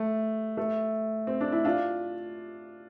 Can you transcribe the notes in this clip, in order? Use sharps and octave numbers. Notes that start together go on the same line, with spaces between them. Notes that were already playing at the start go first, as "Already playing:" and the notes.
Already playing: A3
A3
C4
D4
E4
D4 F4